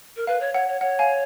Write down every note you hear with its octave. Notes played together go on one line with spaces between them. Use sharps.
A#4
B4 F5
C#5
C#5 F#5
C#5
C#5 F#5
F5 G#5